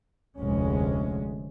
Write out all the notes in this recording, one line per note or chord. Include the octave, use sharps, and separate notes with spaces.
F1 D2 G#3 C#4